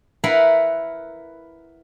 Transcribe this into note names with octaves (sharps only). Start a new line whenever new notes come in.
E4 A#4 B4 F5 F#5